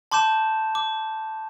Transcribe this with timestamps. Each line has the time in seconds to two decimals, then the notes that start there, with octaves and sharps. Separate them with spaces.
0.11 A5 C6 D6 G6 E7
0.75 D6